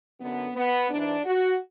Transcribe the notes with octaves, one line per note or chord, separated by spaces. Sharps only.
F#2 D3 B3
B3
G#2 E3 D4
F#4